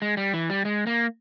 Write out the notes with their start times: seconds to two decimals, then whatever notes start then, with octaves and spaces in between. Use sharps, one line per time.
0.02 G#3
0.17 G3
0.34 E3
0.50 G3
0.65 G#3
0.87 A#3